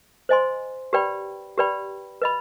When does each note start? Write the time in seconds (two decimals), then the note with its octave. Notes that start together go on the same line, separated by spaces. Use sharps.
0.29 C5 D#5 G#5 C6
0.93 G4 B4 D5 G5 B5
1.58 G4 B4 D5 G5 B5
2.22 B4 D#5 B5